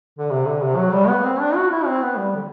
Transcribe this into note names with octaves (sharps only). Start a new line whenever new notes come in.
D3
C3
D3
C3
F#3
G3
B3
C4
D4
F#4
E4
C4
B3
G3
D3